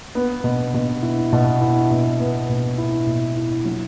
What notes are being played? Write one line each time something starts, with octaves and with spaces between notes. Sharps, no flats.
B3
B2
B2
E4
B2
E4
B2
B3
B2
E4
B2
E4
F#3